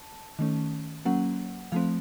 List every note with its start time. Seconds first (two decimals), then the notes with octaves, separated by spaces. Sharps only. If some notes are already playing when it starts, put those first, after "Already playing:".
Already playing: A5
0.39 D#3 A3 C#4
1.05 F#3 A#3 C#4 F#5
1.72 F3 A3 C4 F5